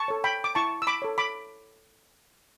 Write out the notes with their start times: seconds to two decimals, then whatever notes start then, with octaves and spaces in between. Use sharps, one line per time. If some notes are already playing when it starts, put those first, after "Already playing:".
Already playing: A5 C#6
0.08 A4 C#5
0.24 G5 B5
0.44 D6
0.55 E4 A5 C#6
0.82 E6
0.87 B5 D6
1.02 A4 C#5
1.18 B5 D6